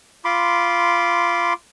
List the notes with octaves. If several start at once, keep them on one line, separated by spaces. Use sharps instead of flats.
F4 B5 C6 D6